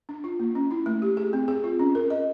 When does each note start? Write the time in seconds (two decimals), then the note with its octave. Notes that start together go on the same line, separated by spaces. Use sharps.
0.09 D4
0.24 F4
0.40 A#3
0.55 C#4
0.71 E4
0.86 A3
1.02 G4
1.17 G#4
1.33 C4
1.48 G#4
1.64 F4
1.79 C#4
1.95 A#4
2.10 D#5